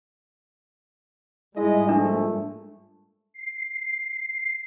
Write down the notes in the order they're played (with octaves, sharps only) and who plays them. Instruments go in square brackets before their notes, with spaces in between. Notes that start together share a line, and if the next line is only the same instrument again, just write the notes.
[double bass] G#2 G3 [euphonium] G#3 [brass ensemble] E4 D#5
[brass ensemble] A#1 [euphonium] A3 [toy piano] D4
[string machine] C7